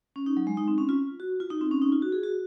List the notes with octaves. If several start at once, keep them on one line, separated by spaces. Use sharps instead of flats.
C#4
D#4
F#3
G#3
D#4
C4
C#4
F4
F#4
F4
D#4
C4
C#4
D#4
F4
F#4
G#4
F#4